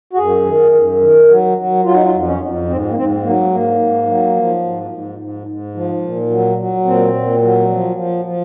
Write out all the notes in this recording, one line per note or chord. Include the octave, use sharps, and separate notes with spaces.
F#4
F#2 G#4
D#3
F#2
D#3
F#3
F#3
F#3 F4
D#4
F4
F2
C#4
F2
G#2 C4
A#3
G#2 C4
F#3 A#3
G#2 A#3
G#2
F#3
F3
G#2
G#2
G#2
G#2
F3
A#2
F#3
F#3
A#2 C4
A#2
F#3
F3
F3
F3